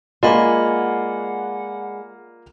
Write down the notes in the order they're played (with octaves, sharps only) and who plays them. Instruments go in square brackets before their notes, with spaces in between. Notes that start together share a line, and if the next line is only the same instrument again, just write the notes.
[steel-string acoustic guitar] G#3 [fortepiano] A#3 F4 [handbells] D5 G#5 B5 [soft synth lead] F#5